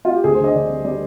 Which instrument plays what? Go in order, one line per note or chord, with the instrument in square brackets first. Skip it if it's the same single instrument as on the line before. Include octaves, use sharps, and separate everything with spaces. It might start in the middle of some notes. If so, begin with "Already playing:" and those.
[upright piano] F4
G4
D2 G#4
C5
D3 D#5
D3 D5
G3
G3 D5